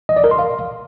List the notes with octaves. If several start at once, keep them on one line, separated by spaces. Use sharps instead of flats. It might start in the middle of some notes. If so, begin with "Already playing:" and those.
D#5
D5
A#4
C6
F5